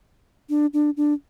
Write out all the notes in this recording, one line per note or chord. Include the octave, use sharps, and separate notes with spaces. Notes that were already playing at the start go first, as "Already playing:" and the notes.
D4
D4
D4